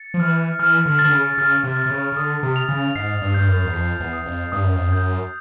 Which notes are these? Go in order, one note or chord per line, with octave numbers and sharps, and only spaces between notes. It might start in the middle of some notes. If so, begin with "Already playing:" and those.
Already playing: A6 C#7
F3
E3 F6
E3 F6
D3
D3 A6
C#3
C#3 F6
C3
F6
C3
C#3
C#3
D3 D#6
C3
F7
C#3
G#2 C7
G2
G2 G6
F#2
E2
F2 C7
E2
D#6
F2
G2 D#6
F#2
F2
F#2 G6